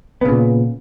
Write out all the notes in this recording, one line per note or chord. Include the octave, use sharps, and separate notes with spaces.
A#2 C#3 B3